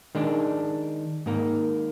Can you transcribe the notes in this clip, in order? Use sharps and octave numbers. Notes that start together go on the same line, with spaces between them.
D#3 G#3 D4
G#2 D#3 A#3